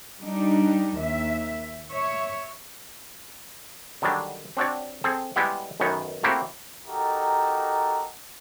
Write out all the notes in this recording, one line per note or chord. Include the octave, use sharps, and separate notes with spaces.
G3 D4 D#4
D#2 E5
C#5 E5
D3 D#3 F#3 G3 D4
C4 D4 F#4 C#5 D5
C4 G#4 A4
G3 G#3 B3 E4 G4 F#5
B1 F#2 D#3 B3 C#5
A3 A#3 C4 E4 F#4 G4
D#4 F#4 G4 A4 A#4